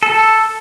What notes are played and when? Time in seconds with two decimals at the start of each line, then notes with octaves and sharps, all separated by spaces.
0.03 A4